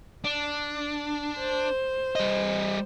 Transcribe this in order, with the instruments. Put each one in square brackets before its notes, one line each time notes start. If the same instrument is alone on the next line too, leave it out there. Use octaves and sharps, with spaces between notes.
[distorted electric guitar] D4
[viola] C5
[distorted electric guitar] G3 D#5